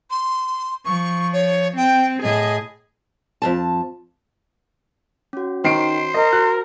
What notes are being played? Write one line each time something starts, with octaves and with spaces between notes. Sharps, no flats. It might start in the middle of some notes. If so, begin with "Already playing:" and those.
C6
F3 C#6
C#5
C4 G5
A2 G#4 D#5
F2 G#2 A5
C#4 F#4
D#3 C5 C7 D7
A#4 D#5
F#4 F#6